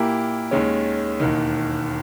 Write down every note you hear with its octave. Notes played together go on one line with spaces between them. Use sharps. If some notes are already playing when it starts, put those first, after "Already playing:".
Already playing: A#2 A#3 E4 G4 A#4
D#2 D#3 G#3 C#4
E1 D#2 D#3